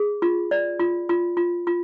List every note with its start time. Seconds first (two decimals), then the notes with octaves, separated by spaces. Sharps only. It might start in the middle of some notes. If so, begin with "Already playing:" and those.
Already playing: G#4
0.22 F4
0.51 D5
0.80 F4
1.09 F4
1.37 F4
1.67 F4